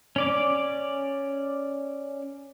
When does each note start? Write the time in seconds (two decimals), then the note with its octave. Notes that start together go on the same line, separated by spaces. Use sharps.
0.16 C#4 D5 D6